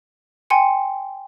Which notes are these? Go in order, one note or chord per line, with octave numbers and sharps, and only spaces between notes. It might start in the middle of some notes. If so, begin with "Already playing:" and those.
G5 G#5 C6 C#7